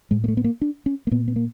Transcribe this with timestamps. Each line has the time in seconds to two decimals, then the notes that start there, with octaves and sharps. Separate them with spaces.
0.11 A2 G#3
0.24 A#3
0.28 A3
0.37 B3
0.44 A#3
0.62 D4
0.86 C#4
1.07 A#3
1.11 A#2 B3
1.28 B3
1.36 A#3